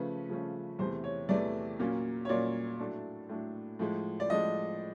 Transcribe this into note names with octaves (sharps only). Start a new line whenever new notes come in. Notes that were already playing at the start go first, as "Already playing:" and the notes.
Already playing: C#3 F3 A3 C#4 B4
C#3 F3 A3 C#4
E2 C3 E3 A3 C5
C#5
E2 C3 E3 A3 D5
A#2 F#3 A#3 C#4
C#5
A#2 F#3 A#3 C#4 D5
A2 F#3 A3 D4
A2 F#3 A3 D4
A2 F3 G#3
D5
A2 F3 G#3 D#5